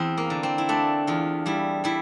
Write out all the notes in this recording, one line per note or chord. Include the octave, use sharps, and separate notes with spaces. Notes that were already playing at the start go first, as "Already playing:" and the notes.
Already playing: E2 C4
A#3
D3
C4
E4
A3 D4
E2 F4
G3 E4
G3 E4